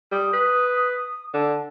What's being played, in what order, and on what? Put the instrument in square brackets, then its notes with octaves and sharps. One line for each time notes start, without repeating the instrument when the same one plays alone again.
[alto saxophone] G3 [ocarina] D#6
[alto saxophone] B4
[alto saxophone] D3 [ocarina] A5